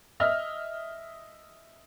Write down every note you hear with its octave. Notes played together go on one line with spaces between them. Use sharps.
D#5 E5 F6